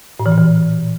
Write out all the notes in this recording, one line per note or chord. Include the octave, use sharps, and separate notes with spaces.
A2
E3
A#2
E3